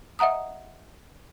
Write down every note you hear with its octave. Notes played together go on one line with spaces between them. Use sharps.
D#5 E5 F#5 A#5 D#6